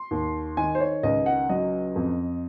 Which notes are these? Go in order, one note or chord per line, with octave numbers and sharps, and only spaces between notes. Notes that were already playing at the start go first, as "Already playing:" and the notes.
Already playing: C6
D#2
D#3 G#5
C5
C#5
C#2 D#5
F#5
F#3 D#5
F2